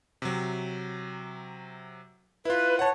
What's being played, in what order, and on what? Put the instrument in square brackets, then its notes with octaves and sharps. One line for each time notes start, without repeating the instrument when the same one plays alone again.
[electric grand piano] C3 F#3
[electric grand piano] E4 F4 [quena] B4
[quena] C#5 [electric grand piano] F#5 A5